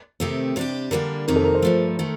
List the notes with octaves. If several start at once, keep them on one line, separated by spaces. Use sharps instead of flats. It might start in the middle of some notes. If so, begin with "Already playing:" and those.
C3 D#3 A3 C4 G4
C3 G3 D4 G4
D3 G3 A#3 D4 A#4
F2 C3 D#3 A#3 D#4 A#4
A4
A#4
C5
G2 F3 A3
D#3 A3